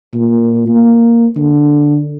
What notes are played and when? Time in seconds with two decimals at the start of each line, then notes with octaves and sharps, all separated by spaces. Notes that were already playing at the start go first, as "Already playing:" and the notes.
0.14 A#2
0.68 A#3
1.36 D3